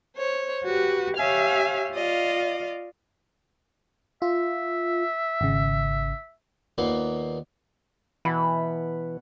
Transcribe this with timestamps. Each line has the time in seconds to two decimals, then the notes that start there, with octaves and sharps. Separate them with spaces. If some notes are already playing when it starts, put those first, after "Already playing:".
0.18 C5 C#5
0.64 F#4 G4 B4
1.17 G4 C#5 E5 F5 G#5
1.93 F4 D5 D#5 F5
4.22 F4 E5
5.41 G#1 C#3
6.78 D#2 A#2 A#3 B3
8.25 B2 E3 F#5 B5